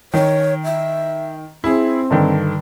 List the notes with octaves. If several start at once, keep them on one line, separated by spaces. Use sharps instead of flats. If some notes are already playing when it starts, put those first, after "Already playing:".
D#3 C#5
E5
C4 E4 G#4
G2 D3 D#3